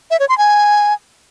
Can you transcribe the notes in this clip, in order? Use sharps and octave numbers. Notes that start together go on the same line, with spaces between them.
E5
C#5
C6
G#5